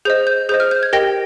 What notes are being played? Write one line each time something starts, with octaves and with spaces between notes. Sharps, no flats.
G#4 C5 D#5 G6
G6
G#4 C5 D#5 G6
F6
G6
G#6
G4 A#4 D#5 G5 A#6